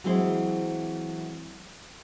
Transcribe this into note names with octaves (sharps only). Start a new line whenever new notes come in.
E3 F#3 G#3 C4 E4 C5